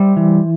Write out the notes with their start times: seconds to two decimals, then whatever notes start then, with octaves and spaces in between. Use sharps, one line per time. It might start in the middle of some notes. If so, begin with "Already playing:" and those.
Already playing: G3 C5 E5
0.17 E3